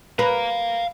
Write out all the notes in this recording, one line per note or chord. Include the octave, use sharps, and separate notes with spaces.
B4 F5 A#5